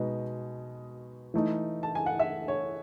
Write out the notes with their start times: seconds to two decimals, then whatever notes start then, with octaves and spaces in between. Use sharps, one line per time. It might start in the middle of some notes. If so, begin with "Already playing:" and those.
Already playing: B2 G#3 B3 D#4 F#4
1.34 E3 A3 D#4
1.83 A5
1.95 G#5
2.06 F#5
2.20 E5
2.48 C#5